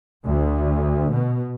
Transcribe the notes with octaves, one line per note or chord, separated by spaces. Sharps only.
D2
B2